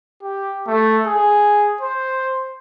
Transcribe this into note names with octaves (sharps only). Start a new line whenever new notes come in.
G4
A3
G#4
C5